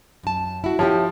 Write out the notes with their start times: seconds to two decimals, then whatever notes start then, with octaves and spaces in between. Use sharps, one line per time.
0.23 F#2 A5
0.64 E4 F#4
0.79 F3 E4 G4 C#5